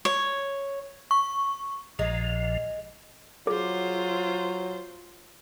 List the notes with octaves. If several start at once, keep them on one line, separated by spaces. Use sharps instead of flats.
C#5
C#6
A#1 A#2 F3 G#3
F#3 F4 G#4 C5